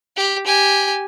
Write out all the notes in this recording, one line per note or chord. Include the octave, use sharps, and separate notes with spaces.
G4
G4 G#5